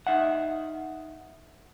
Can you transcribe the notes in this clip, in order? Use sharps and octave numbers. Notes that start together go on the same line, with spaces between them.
D#4 E5 F#5